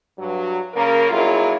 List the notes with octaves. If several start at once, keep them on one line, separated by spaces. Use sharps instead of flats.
G2 F#3
C#3 A#3 A#4
F2 F#3 A#3 E4 F4 G#4